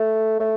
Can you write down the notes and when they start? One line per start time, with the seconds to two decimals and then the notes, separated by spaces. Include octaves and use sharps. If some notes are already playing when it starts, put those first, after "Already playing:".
Already playing: A3
0.40 A3